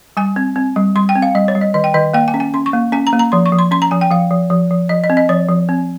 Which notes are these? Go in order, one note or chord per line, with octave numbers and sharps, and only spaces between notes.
G3 G#5
C4
C4
G3
G3 C6
G5
C4
F5
G3 D#5
C#5
G3
D#5
D#3 D#5
G5
D#3 D#5
A#3 G5
G#5
C#4
G#5
C#4 C6
C#6
A#3
C#4 G#5
A#5
A#3
A#5
F3 C6
C#6
F3
C6
C#4 C6
A#5
F3 G#5
G5
F3 F5
F3
F3
F3
F3 D#5
D#5
C4
D#5
F3 C#5
F3
C4